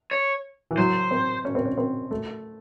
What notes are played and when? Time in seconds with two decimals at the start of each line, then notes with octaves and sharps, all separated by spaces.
0.11 C#5
0.71 E3
0.78 F#3 C5
1.11 C4
1.45 C#4
1.55 C4
1.65 C#4
1.78 C4
2.11 A3